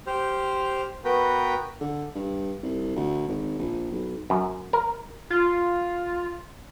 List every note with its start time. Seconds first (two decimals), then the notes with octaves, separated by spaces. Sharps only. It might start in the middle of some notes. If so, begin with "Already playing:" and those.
0.07 G4 C5 F6
1.05 B3 F#4 A#4 B4 G5
1.80 D3
2.15 G2
2.63 C2
2.96 D2
3.28 G#1
3.59 A#1
3.92 B1
4.30 F#2
4.73 A#4
5.30 F4